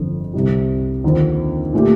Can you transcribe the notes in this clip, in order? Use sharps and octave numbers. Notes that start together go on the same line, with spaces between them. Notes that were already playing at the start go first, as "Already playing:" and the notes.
Already playing: G1 F2 D3
C2 C3 G3
D#2 D3 F3 C4
A#2 A3 D4 G4